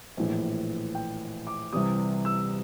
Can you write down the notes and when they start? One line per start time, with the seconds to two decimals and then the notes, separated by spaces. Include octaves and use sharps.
0.17 A#1 A2 E3
0.95 G5
1.47 D6
1.73 C2 C3 E3 G3 D#6
2.25 E6